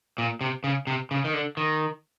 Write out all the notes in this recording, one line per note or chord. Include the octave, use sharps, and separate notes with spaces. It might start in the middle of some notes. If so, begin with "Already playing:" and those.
A#2
C3
C#3
C3
C#3
D#3
D3
D#3